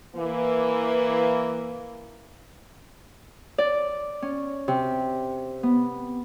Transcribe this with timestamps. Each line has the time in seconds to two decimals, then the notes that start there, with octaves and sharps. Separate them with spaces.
0.16 E3 A#3
3.58 D5
4.22 C#4
4.68 C3
5.63 B3